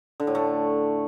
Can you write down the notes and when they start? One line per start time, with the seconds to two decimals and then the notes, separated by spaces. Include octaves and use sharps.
0.20 D3
0.27 A2
0.35 A3